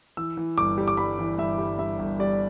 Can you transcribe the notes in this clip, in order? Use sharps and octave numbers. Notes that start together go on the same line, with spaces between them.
E3 E6
E3
G1 D6
G3
D6
G3 B5
E3
G2 E5
G3
G2 E5
G1
G3 D5